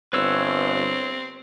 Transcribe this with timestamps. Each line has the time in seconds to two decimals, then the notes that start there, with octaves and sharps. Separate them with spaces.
0.13 G1 C4 B4 C#5 E6